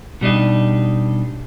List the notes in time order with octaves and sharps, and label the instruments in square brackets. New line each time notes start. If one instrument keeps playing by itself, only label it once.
[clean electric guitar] B2 G3 D4 D#4